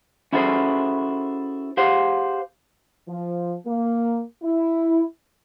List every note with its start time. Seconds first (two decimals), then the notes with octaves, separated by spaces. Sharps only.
0.33 C#4 E4 F#4 G#4 A4 C5
1.77 G4 G#4 C5 F5 F#5
3.09 F3
3.66 A#3
4.43 E4